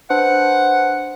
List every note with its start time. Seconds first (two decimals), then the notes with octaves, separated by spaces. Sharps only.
0.10 D4 B4 C5 F#5